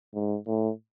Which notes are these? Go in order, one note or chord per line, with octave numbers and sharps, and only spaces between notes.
G#2
A2